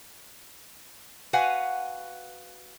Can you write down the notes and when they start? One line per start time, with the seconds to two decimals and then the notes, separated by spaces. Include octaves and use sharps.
1.33 F#4 B4 F5 F#5 G#5